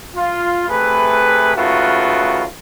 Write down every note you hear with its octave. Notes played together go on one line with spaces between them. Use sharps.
F4
C3 A3 G#4 B4
D#2 C#3 A3 F4 F#4 B4